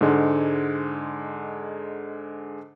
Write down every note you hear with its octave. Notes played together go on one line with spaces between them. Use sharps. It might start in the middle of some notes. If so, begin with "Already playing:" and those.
G#2 D3 G#3